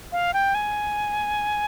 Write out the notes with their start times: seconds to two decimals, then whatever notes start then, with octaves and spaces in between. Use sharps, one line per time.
0.12 F5
0.34 G5
0.55 G#5